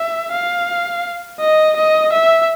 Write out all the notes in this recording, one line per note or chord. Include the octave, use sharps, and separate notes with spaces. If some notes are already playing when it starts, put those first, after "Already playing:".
Already playing: E5
F5
D#5
D#5
E5